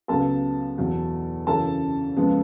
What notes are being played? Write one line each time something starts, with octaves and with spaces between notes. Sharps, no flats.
C#2 C#3 F#3 B3 A4 A5
E2 B2 F#3
F#2 C#3 E3 A4 A5
C#2 C#3 F3 G#3 B3